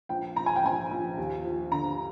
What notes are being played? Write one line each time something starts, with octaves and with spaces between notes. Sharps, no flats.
A#1 G5
A#1 A#5
G#5
G5
A#1 G#5
A#1
D#2
F3
D3 A#5